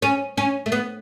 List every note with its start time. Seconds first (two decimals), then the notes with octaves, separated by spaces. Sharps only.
0.02 C#4
0.37 C#4
0.66 A3
0.72 B3